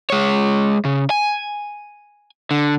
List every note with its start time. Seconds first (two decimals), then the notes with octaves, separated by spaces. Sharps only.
0.10 G#3 C#5
0.85 C#3
1.10 G#5
2.51 D3